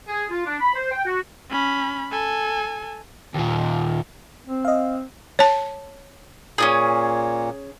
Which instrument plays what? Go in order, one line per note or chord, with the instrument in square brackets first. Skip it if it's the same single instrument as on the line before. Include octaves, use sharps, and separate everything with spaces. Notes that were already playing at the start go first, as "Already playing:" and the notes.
[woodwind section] G#4
F4
D4
B5
C5
G5
F#4
[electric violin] C#4 B5
A4 G#5
[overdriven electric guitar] D#2 A#2
[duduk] C4
[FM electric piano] D#5 F5
[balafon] C#5 A5
[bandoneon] A#2 [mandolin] C#4 D4 G#4